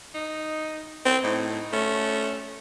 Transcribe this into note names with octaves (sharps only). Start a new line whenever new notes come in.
D#4
C4
A2 D#4
A3 C#4